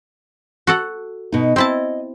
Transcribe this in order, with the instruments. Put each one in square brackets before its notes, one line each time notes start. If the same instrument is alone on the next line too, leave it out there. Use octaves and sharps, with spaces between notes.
[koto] F#4 A4 F#5
[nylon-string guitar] B2 D#4
[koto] C4 E4 A5 [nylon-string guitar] D#5